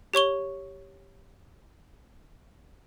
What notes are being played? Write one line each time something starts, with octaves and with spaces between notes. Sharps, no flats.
G4 C#5 C#6 G7